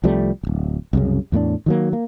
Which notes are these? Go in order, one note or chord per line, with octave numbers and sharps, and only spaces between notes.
C2 F3 G3 A3
D1 G#1
C2 F#2 C#3
E2 A2 A3 D4
D#3 F#3 A#3
A#3